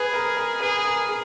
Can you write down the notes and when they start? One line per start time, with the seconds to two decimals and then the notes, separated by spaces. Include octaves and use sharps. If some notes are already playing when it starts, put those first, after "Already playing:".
Already playing: G#4 B4
0.13 A#4
0.37 A#4
0.61 G#4 B4
0.85 A#4
1.08 G#4